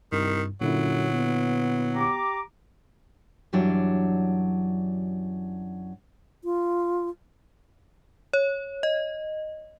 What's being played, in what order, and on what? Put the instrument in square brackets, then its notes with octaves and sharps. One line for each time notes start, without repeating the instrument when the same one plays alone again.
[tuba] C2 [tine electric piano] G2 [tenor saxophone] D#3
[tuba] F#2 [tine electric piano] A#2 D3 E4 [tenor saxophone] F#3
[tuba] B3
[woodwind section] G4 A#5 D6
[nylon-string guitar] F#2 E3 F#3 G3 D4 D5
[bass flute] F4
[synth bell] C#5
D#5